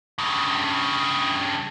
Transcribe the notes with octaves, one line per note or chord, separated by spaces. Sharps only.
G2 C#3